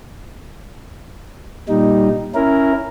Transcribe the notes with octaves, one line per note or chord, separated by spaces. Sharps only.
A#2 G3 D#4
C#4 E4 A#4